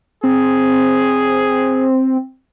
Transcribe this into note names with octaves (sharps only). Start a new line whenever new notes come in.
C4 G#4